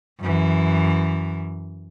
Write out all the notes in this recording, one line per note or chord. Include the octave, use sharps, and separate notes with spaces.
F#2 E3